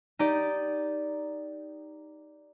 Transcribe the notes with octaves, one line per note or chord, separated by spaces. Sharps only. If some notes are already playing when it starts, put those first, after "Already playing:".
D#4 G4 D5